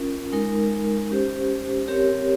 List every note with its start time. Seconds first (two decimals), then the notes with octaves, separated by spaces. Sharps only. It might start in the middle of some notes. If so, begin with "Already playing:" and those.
Already playing: C#4 F4 A#4
0.33 G#3 D#4 A#4
1.10 C#4 G4 C5
1.88 C4 G4 A#4 C#5